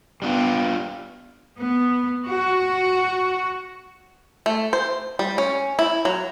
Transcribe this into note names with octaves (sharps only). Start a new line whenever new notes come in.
G3 B3 D4 F4 G5
B3
F#4
A3
C5
G3
C#4
E4
F#3